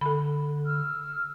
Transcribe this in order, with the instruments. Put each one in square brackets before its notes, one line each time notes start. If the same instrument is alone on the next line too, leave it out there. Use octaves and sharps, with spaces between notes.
[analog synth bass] D3 [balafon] A4 B5
[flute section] E6 F6